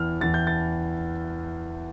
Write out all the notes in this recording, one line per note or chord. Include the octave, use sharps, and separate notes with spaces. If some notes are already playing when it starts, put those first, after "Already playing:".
Already playing: E2 E3 F6
E2 E3 A6
G6
A6